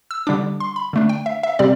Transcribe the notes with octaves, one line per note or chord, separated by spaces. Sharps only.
E6
D3 G3 D4 D6
C6
B5
D3 A3 D4
G5
E5
E5
C3 G3 C4 D5